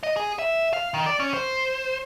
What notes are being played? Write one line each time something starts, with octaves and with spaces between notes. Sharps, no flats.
D#5
G#4
E5
F5
D#3
D5
C#4
C5